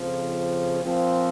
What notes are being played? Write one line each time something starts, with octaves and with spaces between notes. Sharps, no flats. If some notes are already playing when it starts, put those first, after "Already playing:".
Already playing: F2 C#3 F3
A#2 F3 C4